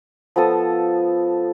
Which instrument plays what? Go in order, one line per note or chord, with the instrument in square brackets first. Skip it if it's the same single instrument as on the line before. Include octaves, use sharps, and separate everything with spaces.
[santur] F3 B3 A4 D#6